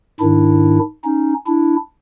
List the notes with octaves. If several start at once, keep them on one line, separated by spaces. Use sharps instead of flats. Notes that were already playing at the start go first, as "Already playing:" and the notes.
G#2 D#3 D4 E4
C#4 D#4
D4 E4